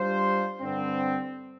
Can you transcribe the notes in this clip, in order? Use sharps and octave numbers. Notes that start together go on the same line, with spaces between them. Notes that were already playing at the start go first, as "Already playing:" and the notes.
Already playing: G3 D4 F4 C5
G2 D3 G3 C4